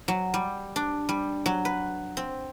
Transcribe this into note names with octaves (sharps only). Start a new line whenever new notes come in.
F#3
G3
D4
G3
F#3
B4
C4